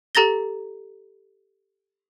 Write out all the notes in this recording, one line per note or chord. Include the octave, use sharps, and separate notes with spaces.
G4 A4 A#5 A6 A#6 G7